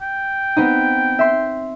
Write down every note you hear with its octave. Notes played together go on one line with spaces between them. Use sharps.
G5
B3 C4 D#4
E5 C6